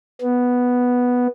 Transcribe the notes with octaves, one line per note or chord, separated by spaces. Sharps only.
B3